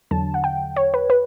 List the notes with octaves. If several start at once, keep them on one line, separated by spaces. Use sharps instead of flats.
E2 D3 F#3 A5
F#5
G5
C#5
B4
B4